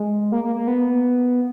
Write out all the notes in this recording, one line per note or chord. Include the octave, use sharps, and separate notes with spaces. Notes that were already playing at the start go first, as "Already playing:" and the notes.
Already playing: G#3
A#3
A#3
A#3
B3